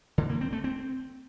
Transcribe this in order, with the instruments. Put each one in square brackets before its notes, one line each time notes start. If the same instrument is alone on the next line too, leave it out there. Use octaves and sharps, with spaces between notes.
[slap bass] D3
A#3
C4
A3
C4